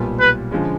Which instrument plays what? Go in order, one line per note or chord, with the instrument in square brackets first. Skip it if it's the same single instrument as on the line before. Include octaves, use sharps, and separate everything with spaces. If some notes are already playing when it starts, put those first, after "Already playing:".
Already playing: [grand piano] B1 A#2 G3 B3
[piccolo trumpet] B4
[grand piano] D3 F3 G#3 C#4